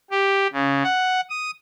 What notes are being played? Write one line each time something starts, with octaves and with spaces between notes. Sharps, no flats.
G4
C#3
F#5
D#6